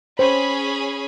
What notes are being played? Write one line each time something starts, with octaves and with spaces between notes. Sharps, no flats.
C#4 G#4 C5 B5